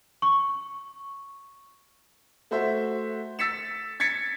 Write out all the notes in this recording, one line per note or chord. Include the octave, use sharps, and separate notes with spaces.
C#6
A3 F#4 C5 E5
E6 A6 B6 C#7 E7
G#6 A6 B6 C#7